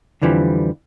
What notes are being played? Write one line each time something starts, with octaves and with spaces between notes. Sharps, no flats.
F2 D3 E3 F3 G3